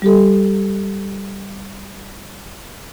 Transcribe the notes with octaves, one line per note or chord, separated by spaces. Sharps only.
G3 G4 A4